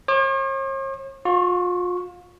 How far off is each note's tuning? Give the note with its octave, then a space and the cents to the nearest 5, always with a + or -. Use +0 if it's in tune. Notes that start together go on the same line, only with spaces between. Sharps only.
C#5 -45 D6 +35
F4 +35 C#6 +0